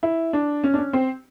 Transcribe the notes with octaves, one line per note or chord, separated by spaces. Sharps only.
E4
D4
C#4
D4
C#4
C4